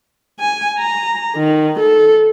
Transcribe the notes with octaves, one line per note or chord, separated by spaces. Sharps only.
G#5
A#5
D#3
A4